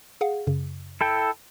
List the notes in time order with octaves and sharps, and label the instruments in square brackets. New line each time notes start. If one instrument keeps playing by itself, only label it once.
[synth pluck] G#4 F5 F#5
F#2 C#3
[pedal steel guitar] E4 A4 G5